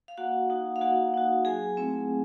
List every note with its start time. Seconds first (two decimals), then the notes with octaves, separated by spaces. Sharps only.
0.08 F5
0.17 A#3 F#4 F#5
0.50 D#4 F#4
0.76 F5
0.81 A#3 F#4 F#5
1.14 D#4 F#4
1.45 F#3 G#4 G#5
1.77 A3 C4 E4